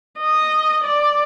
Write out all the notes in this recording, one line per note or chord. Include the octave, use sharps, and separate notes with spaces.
D#5
D5